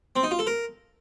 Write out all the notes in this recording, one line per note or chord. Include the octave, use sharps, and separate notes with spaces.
C4
D#4
F4
A4
A#4